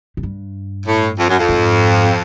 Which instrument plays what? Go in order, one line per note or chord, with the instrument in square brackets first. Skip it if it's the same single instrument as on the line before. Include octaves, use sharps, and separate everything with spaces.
[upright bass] G#2
G2
[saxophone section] A2
F2
F#2
F2
[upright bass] G#2